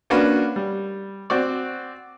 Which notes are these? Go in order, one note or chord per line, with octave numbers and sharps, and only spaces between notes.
A#3 C#4 D4 F#4 B4
G3
C4 F#4 D5